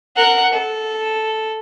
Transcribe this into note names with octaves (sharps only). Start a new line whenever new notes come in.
A#4 F#5
A4